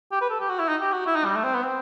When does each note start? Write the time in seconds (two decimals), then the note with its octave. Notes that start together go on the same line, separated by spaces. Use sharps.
0.12 G4
0.21 B4
0.30 A4
0.40 G4
0.49 F#4
0.59 E4
0.68 D#4
0.81 G4
0.92 F#4
1.07 E4
1.16 D#4
1.25 G3
1.35 A3
1.44 C4
1.54 B3
1.63 C4